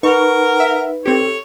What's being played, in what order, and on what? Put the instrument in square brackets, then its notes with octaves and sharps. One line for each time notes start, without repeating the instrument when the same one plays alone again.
[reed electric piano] D#4 B4 [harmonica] A#4 [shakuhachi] F#5 [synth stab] C#6
[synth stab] E5
[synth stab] C4 G4 [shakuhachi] A4 [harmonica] C#5